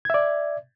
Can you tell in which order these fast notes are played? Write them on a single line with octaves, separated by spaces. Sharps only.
G#6 E5 D5